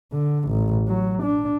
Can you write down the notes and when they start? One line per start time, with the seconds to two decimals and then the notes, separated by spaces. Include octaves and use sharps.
0.13 D3
0.49 A1
0.88 F#3
1.23 D4